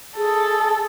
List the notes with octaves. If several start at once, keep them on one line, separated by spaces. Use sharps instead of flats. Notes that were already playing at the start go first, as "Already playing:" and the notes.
G#4 A4